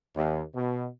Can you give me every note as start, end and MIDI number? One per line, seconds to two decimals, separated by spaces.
0.15 0.41 39
0.55 0.87 47